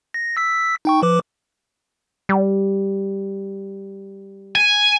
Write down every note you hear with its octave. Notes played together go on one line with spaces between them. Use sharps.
A#6
E6 B6
D#4 G5 C#6
F3 B4 D6
G3
G#5